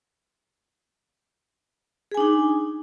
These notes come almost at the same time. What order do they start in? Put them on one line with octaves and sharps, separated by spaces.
G#4 G#5 D4 D#4